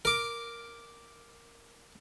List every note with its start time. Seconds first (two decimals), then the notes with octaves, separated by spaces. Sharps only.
0.05 A#4 D6